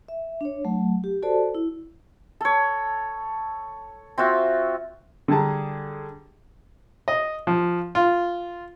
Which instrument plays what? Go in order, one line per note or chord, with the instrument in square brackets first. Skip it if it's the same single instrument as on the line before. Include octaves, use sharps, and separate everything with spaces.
[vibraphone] E5
D4 C#5
F#3 A3
G4
F#4 A4 C5 D5 A5
E4
[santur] A4 C#5
C4 F4 F#4 E5
[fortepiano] D3 G3 G#4 A5 A#5
D#5
F3
F4